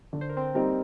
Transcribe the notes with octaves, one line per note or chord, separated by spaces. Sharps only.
D3
C5
A#4
C4 C5
G3 A#3 C4 D#4 A#4